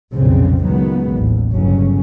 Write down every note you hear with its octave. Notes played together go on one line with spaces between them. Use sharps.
B1 F2 A#2 C#3 G3 C4
C#2 A#2 D#3 F#3 G#3 B3
A1 D#2
G1 C#3 F#3 C#4